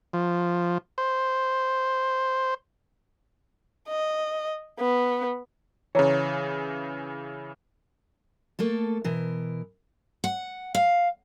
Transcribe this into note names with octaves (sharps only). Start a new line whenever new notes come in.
F3
C5
D#5
B3
C#3 E3 C#5 A#5
A3 A#3 A4
B2 E3 A#4
F#5
F5